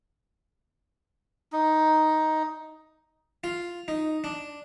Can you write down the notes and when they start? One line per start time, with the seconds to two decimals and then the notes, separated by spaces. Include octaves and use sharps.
1.53 D#4
3.44 F4
3.88 D#4
4.24 D4